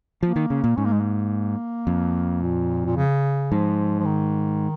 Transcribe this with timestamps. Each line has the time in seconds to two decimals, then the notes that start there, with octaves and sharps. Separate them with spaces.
0.23 F3 A#3
0.36 D#3
0.50 C#3
0.64 A#2
0.77 G#2 C#4
0.85 A#3
0.92 G#3
1.00 A#3
1.87 F2
2.42 A#2
2.85 A#2
2.96 C#3
3.52 G#2 F3
4.00 F3
4.06 D#3